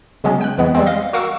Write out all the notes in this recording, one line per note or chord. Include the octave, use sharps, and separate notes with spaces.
C#3 F#3 G#3 B3 C#4
G5 F#6
F2 E3 G#3 B3
G3 G#3 C4
D#5 F5
F#4 A#4 F5 F#5 C#6 E6